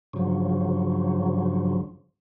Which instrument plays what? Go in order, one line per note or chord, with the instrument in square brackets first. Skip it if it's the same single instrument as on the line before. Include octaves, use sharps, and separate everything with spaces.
[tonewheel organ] G2 C#3 F3 F#3